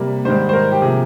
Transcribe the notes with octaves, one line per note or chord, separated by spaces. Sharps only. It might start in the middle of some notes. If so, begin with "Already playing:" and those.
Already playing: C3 G3 A#3
G#2 D#3 G3 C5
C5
A#4
G4
C3 F3 A#3 G#4